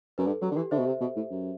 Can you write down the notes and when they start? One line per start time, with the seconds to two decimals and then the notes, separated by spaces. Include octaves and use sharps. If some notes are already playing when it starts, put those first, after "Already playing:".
0.18 F#2 B4
0.27 G2 A4
0.42 F#3 G4
0.52 D3
0.56 E3 G4
0.71 D3 C5 E5
0.79 B2
0.87 C3
1.01 B2
1.16 A2
1.30 F#2